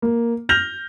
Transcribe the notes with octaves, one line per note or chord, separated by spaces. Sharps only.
A#3
F6 G6 A#6 F7